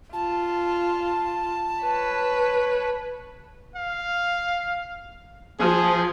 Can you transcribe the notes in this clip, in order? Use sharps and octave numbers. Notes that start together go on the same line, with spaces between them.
F4 A5
B4 C#5
F5
F3 G#4